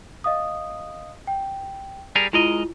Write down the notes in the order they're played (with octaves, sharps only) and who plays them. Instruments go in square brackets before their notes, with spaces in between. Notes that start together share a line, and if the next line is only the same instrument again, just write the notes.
[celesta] D#5 F5 D#6
G5
[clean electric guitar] G3 G#4 A#4
[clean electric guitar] G#3 A#4 D#5 [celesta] E4 F4